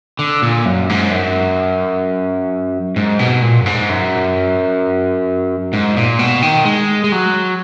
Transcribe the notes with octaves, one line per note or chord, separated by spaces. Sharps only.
D3
A#2
F#2
G#2
F#2
G#2
B2
A#2
F#2
G#2
F#2
G#2
A#2
B2
D#3
G#3
G#3
F#3